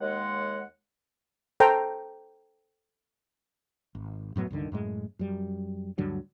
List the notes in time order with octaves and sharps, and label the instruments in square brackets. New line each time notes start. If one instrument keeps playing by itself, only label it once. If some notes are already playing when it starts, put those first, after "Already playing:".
[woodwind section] D#2 G#3 F#5
[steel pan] A4 C5 G5 A5 A#5
[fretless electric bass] G#1
F#2 A2 F#3 B3
C#2 G2 D3 D#3
F#2 A2 G#3
F#2 G3
D2 G2 D3 F#3